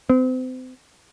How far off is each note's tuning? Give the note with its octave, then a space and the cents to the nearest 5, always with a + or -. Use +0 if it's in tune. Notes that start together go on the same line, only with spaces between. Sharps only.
C4 -35